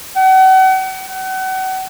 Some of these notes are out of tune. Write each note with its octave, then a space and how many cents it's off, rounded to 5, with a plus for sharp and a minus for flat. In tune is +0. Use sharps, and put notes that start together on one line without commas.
F#5 +40
F#5 +35